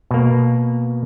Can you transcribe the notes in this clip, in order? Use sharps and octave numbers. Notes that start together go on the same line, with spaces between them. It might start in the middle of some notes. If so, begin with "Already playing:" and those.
B2 A#3